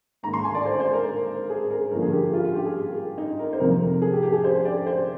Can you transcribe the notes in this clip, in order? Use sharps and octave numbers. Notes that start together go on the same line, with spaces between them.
G#2 D#3 A#3 A#5
C6
G#5
D5
C5
C5
A#4
G#4
A#4
G2 D3 F3 A#3 A#4
G#4
G4
F4
F4
G4
G#4
D#4
A#4
C5
F2 C3 F3 A#3 A#4
G#4
G4
G4
G#4
C5
D5
C5